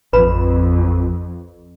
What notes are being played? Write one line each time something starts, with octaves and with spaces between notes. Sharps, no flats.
A1 F2 B4 B5